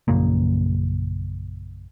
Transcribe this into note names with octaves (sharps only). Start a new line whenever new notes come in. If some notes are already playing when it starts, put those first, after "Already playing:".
A#1 F#2 C#3 A#3